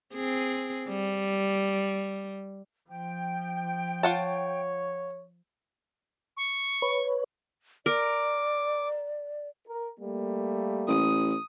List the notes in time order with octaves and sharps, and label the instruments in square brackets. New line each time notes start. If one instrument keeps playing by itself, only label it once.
[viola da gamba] C4 G#4
G3
[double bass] F3 [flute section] G5
[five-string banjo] F4 F#5 A5 [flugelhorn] C#5
[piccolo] C#6
[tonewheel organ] B4 C#5
[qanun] A#4 [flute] D5 [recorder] D6
[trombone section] A#4
G3 A3 A#3
[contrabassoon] A1 [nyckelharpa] D#6